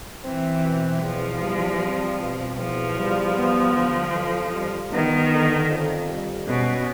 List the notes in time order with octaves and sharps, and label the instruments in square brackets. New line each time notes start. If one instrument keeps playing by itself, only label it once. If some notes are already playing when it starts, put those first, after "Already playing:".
[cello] E3 [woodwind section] C4
[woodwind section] B2
[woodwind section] E2 [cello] F3
[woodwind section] G3
C4
B2
[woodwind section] E2 [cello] F3
[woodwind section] G3
B3
D3
F2
G3
[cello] D#3 [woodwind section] B3
[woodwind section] D3
F2
G3
[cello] B2 [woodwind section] C#4